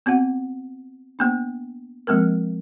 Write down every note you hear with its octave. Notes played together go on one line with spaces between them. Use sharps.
B3 C4 F#4 F#5
A#3 B3 D4
F3 G#3 A#3 C4 A#4